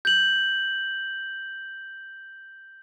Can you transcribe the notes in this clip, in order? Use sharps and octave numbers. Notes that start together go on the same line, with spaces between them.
G6 F#7